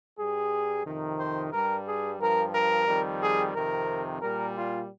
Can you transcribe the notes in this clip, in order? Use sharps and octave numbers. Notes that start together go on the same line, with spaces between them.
G2 G3 G#4
F2 C3 D#3
C5
G2 G3 A#4
G#4
G2 F3 A#4
A#4
F2 D#3 G3
G#4
F2 C3 D#3 A#4
A#2 G3 A#4
F4